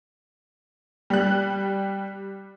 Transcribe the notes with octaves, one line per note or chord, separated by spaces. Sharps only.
G3 F#6